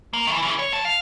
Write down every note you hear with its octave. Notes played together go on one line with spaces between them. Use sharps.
A#3
D#3 E3
C#3 E3
C#5
F#2 A5
F5